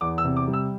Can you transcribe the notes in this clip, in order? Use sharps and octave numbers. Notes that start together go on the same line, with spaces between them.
E2 D6
E6
C3
D6
G3
E6